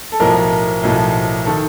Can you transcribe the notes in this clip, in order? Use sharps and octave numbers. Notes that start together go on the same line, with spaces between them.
A4
B1 A2 F3 A#4
B1 A2 F3
D#3 A4